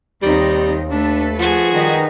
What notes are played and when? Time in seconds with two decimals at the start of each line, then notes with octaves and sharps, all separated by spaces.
0.22 D#2 D#3 G3 C4 D#4
0.91 A3 D4 A4 B4
1.39 F3 F#4 G#4
1.72 D#3 G3 D#4 B4